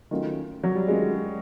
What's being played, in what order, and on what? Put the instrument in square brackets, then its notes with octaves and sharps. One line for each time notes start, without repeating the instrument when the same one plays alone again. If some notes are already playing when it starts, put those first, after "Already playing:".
[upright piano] D#3 F#3 A3 C#4 F4
[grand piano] F#3
G3
[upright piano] D#3 F#3 A3 C#4 F4 [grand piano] G#3